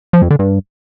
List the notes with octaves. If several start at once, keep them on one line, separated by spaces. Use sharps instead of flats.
F3
F2
D3
G2